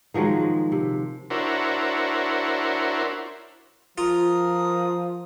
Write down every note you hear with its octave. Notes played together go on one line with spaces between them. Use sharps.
D#3 F3 F#3 G#3
C3
D4 E4 F#4 A#4 C5 C#5
F3 F4 A#4 D#6